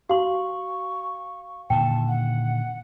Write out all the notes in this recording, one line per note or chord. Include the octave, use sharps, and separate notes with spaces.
F#4 F5 C6 C#6
A#2 D3 D#3 G5 A5
F#5